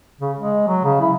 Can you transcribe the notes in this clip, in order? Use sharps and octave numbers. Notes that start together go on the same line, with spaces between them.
C#3
G#3
F#3
C#3
E4